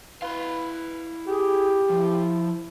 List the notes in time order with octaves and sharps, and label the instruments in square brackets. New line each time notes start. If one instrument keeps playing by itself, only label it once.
[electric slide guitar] E4 F5 [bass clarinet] B4
[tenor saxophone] G4 [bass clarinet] G#4
[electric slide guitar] F3 [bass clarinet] E4